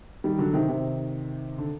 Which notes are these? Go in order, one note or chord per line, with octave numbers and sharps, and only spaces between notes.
D#3 G3
D3 F#3
C3 D#3
C3 D#3
D3